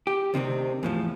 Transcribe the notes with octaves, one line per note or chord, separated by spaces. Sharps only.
G4
D2 C3 D#3 C4
E2 A2 F3